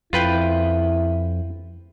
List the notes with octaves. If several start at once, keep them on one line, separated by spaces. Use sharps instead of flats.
F2 E4 F4 B4 G5